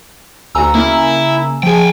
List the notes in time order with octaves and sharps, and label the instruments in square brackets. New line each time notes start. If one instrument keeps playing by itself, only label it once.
[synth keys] D2 F#4 [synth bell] G#5 A#5 E6
[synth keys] C#3 A#3 [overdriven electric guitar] E4
[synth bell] F3 G#4 [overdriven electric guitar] G5 G#5